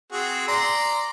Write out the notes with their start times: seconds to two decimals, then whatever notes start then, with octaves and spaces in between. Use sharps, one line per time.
0.12 C4 F#4 G#4
0.48 D5 A#5 C6